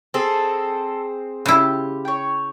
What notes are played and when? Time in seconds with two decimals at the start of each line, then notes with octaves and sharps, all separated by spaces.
0.14 C4 G#4 A4 A5
1.46 C#3 E4 F4 G4
2.05 C#5 G5